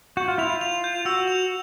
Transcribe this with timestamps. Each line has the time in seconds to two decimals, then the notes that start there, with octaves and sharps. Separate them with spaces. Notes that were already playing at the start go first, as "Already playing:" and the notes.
0.17 F#4 G6
0.28 F4
0.38 E4 F7
0.50 F4
0.61 F7
0.84 G6
1.05 F#4 E6
1.28 F7